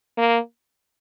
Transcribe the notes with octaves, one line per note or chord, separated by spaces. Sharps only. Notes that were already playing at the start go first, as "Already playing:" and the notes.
A#3